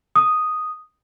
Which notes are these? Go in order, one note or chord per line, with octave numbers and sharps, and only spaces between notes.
D#6